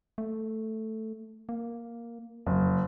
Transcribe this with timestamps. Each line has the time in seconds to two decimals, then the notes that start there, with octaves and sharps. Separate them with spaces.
0.18 A3
1.49 A#3
2.46 F#1 F2